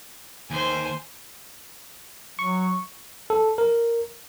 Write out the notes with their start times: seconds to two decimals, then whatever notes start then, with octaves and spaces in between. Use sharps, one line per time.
0.51 D#2 C5 G#5
2.39 F#3 C#6
3.30 A4
3.58 A#4